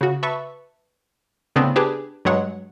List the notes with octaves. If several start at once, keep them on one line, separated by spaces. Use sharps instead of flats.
C#3 F#4
B4 E5 A5 C#6
A2 C#3 B3 C4 D4
D4 G4 G#4 B4
G2 F#3 G#3 C#5 F#5